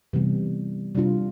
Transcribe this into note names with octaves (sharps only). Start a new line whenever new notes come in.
C3 E3 G3 B3
C3 G3 D4 F4